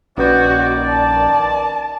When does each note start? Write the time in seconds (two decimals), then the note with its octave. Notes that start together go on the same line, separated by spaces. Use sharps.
0.17 A#1 D#3 C#4 F#4 B4 D5 G6
0.89 A5